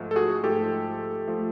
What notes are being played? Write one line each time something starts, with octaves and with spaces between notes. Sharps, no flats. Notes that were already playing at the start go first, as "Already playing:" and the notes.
Already playing: G#2 F3 A3
A4
F#4 G#4
G#2 F3 A3 G4 A4
F3 A3